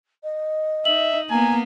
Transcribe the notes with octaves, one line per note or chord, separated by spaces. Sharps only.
D#5
D#4 E5 F#7
A#3 B3 G#5 A#5